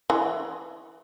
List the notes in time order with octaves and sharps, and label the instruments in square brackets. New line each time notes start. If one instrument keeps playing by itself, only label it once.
[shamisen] E3